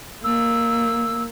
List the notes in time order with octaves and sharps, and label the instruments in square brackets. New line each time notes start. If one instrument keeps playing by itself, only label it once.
[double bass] A#3 [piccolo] E6